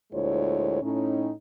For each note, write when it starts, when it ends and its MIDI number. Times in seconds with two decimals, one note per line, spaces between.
0.12 0.82 38
0.12 0.82 46
0.12 0.82 56
0.12 0.82 64
0.12 0.82 72
0.12 0.82 73
0.82 1.31 45
0.82 1.31 61
0.82 1.31 63